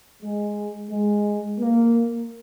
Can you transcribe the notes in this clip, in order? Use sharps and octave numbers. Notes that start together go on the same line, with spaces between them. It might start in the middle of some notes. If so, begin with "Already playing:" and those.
G#3
G#3
A#3